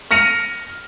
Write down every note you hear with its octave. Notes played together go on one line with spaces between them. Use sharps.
F6 A#6 C#7 D#7 F7